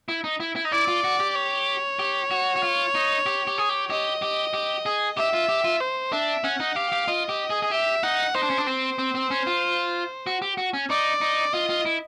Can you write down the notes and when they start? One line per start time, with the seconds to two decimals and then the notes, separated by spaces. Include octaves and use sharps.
0.08 E4
0.24 D#4
0.40 E4
0.56 E4
0.65 D#4
0.72 E4 D5
0.88 F4
1.04 F#4
1.20 G4
1.35 C#5
1.99 G4
2.31 F#4
2.56 F#4
2.63 F4
2.95 D#4
3.26 G4
3.47 G4
3.58 G#4
3.69 G4
3.90 G4 D#5
4.22 G4
4.54 G4
4.86 G#4
5.17 G4 E5
5.34 F4
5.49 G4
5.64 F4
5.81 C5
6.13 D4 E5
6.44 C#4 F#5
6.60 D#4
6.76 G4 F5
6.92 G4
7.08 F4 D#5
7.29 G4
7.50 G#4
7.62 G#4
7.71 G4 E5
8.04 D#4 F#5
8.35 D#4 C5
8.43 D4
8.50 C#4
8.58 D4
8.67 C4 C5
8.98 C4
9.15 C4
9.31 C#4
9.47 F4
10.27 F#4
10.42 G4
10.57 F#4
10.73 C#4
10.90 D#4 D5
11.21 D#4
11.53 F4 D#5
11.69 F4
11.85 E4